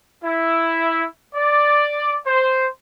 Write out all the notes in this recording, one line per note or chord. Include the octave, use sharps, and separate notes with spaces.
E4
D5
C5